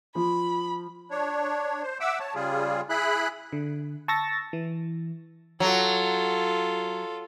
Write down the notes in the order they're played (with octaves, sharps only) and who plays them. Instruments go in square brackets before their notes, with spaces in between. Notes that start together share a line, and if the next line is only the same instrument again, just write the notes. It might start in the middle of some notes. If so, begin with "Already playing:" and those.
[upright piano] F3 [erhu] B5
[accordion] D4 C#5
C5
E5 F#5 D6 E6
C#5 A5
C#3 G3 F4 G#4
E4 G#4 B5 F#6
[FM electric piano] D3
A5 C#6 E6 A6 A#6
E3
[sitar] F#3 [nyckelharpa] F4 A4